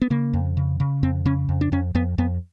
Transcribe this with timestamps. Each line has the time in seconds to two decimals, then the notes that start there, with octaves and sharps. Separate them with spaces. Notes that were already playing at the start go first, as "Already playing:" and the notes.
0.02 B3
0.10 C#3 A#3
0.33 F2
0.57 C#3
0.80 C#3
1.03 F2 C4
1.26 C#3 C#4
1.49 F2
1.61 D4
1.72 F2 C#4
1.95 F2 B3
2.18 F2 B3